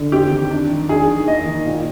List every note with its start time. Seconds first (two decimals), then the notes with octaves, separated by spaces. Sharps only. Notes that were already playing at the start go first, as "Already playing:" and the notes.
Already playing: D3
0.12 C4 G4
0.31 D#3
0.51 D4
0.70 D#3
0.89 D4 G#4
1.08 D#3
1.27 A#3 D#5
1.47 D#3
1.66 A#2